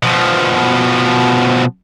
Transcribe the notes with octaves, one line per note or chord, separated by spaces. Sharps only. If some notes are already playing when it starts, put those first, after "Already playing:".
B2 F3